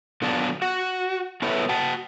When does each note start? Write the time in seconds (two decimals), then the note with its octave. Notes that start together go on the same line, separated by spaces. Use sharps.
0.22 D3 F#3 B3 F4 D5 A5
0.62 F#4
1.42 B3 E4 A4 B4 C#5 E5
1.69 F#4 G5 A5